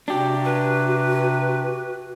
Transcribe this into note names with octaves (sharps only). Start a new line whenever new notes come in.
C3 D4 F#4 G4
B4